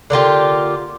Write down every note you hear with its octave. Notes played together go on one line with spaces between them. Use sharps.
D3 A#3 F4 G4